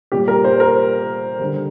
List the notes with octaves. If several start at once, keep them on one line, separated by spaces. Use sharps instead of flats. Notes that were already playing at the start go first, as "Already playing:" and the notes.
A#2 G3 G4
A#4
C5
A#4
D3 G3